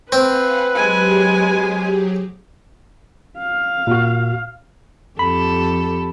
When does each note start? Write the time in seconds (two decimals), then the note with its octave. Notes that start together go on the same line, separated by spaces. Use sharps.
0.12 C4 B4 F5 F#5 G#5
0.75 F#3 G#3 G4 G#4 G#5
3.38 F5
3.87 A#2 F#4
5.19 F2 G4 A4 B5